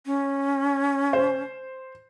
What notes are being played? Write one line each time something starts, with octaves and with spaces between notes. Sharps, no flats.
C#4
C5